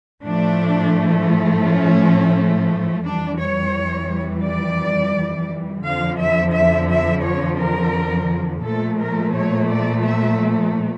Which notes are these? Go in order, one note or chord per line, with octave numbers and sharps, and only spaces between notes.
A2 F3 A3 D4
C#4
F2 E3 G3 D4
C#5
D5
F2 D3 F3 F5
E5
E5
E5
C#5
A#4
A#2 F3 A3 A4
A#4
C#5
D5
E5